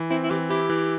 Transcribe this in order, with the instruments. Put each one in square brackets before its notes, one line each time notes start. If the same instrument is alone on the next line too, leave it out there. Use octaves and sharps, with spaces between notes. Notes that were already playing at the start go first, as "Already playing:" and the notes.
Already playing: [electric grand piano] E3
[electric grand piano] C4 [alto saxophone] E4
[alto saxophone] E4
[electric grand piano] E3 [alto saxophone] G4
[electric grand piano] E4 [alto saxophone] G4
[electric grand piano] E3